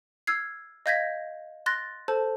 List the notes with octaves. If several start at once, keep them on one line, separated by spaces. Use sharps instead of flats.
E6 F6 G#6 C7
D#5 F5 G6 G#6 A#6 B6
C6 F#6 A6 A#6
A4 C5 A5